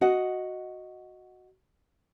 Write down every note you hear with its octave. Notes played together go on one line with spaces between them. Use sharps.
F#4 D#5 F#5